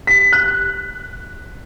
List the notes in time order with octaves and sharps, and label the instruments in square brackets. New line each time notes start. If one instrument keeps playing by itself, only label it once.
[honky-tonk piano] B6
F#6